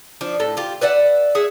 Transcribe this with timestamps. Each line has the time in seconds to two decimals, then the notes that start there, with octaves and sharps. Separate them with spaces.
0.21 F3 D4
0.40 A2 A4
0.57 F4 G4
0.81 B4 D5 E5 F#5
1.35 G#4 E5 F#5